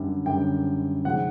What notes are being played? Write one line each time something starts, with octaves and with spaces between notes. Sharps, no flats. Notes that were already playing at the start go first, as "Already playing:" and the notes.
Already playing: F#2 D3 G3
F#2 D3 G3 G5
C3 F3 G#3 C4 D#4 F#5